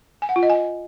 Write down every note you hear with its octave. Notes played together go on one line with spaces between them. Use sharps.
G#5
F#5
F4
D#5
G#5